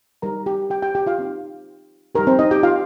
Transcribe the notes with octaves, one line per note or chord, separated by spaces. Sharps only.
G3 D#4 G4 A#4 A#5
G4 G5
G4 G5
G4 G5
G4 G5
F4 F5
C4 D#4 G4
G3 D#4 G4 A#4
C4 C5
D#4 D#5
G4 G5
F4 F5